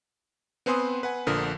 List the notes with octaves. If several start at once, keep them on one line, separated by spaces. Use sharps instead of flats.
B3 C4 B4 G#5 C6 D#6
B4 F#5 G#5
A#1 D3 F3 A#4 D#6